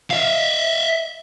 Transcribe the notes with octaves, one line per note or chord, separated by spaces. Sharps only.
E5 F5